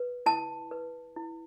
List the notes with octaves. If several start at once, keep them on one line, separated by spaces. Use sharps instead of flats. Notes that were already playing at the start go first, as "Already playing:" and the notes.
Already playing: B4
E4 A5
B4
E4